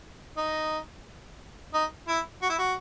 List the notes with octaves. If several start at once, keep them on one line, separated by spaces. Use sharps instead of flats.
D#4
D#4
E4
F#4
E4
F#4